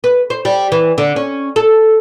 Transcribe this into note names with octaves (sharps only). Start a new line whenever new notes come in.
B4
C5
G3
E3
D3
C#4
A4